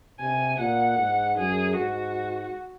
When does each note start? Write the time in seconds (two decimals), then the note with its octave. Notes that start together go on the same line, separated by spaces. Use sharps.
0.20 C3 G#5
0.59 A#2 F#5
0.98 G#2
1.38 F#2 G#4
1.76 G#2 F#4